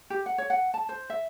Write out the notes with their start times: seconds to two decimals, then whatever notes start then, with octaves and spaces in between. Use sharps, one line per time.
0.10 G4
0.26 F#5
0.38 C#5
0.50 F#5
0.74 A5
0.89 C5
1.10 E5